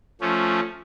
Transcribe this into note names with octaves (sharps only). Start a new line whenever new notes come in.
F3 A3 C#4